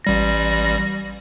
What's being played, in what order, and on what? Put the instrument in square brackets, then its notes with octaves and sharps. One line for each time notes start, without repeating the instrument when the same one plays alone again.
[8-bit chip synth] A1 G3 A#6